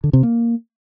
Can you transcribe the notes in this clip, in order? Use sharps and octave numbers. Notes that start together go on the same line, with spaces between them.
D3
C3
A#3